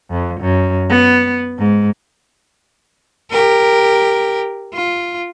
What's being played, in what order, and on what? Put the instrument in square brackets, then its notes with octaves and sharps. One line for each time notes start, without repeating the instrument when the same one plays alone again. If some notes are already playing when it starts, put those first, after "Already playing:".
[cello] F2
F#2
B3
G#2
G4 A#4
F4